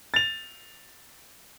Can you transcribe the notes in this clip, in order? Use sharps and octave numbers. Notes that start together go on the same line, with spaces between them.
A6 F7